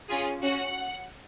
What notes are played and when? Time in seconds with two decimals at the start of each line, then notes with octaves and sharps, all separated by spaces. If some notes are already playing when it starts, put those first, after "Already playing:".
0.08 C#4 F4 G#4
0.42 C#4 F#4 F#5